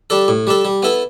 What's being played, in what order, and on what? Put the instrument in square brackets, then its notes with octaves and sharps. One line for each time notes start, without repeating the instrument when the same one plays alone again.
[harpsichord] G3 D4 A4
A2
G3 D4 A4
G3
B3 E4 A4